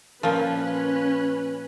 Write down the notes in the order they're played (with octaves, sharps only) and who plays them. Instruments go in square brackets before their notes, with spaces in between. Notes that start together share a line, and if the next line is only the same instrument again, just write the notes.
[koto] A#2 F3 [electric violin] C#4 B4